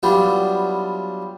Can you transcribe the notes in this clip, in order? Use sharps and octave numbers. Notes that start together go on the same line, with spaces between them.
F#3 G3 B3 D4 E4 F4